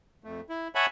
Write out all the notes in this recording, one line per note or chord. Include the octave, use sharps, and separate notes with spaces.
F2 A3
E4
C#5 E5 F#5 G#5 A5 B5